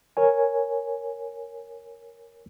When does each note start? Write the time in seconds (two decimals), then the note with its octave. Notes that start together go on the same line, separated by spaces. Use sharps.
0.17 A#4 C#5 G#5